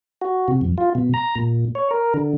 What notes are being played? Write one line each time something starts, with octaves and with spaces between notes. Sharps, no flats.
F#4
C3
F2
F4
B2
A#5
A#2
C#5
A#4
D3